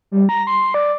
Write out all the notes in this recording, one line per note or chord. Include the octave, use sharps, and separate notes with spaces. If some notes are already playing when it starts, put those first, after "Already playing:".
G3
A#5
C6
D5